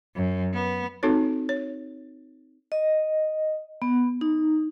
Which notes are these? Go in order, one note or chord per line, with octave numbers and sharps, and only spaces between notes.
F#2
B3
C4 D#4 F#4 A4 C#5
C#5
D#5
B3
D#4